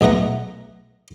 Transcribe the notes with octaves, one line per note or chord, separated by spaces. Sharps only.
B1 B2 A3 F#5 A#5